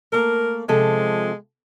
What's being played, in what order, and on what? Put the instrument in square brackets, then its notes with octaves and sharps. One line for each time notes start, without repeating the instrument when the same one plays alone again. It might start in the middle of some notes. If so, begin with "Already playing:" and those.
[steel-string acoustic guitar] A3 A#3 [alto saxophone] A#4
[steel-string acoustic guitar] C3 F3 A4 [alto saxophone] G#3